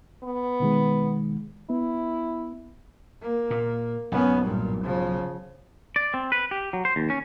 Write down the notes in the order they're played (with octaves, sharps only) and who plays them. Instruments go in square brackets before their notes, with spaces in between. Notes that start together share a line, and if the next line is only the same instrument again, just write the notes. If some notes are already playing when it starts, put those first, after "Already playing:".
[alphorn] B3
[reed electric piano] B2 D#3 G#3
[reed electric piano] B3 [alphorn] E4
[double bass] A#3
[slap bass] A#2
[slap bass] B1 G#2 [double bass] B3 C#4
[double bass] G2 A#2
C#3 F3
[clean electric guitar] D5
C4
B4
G4
F#3
C5
D#2
C#4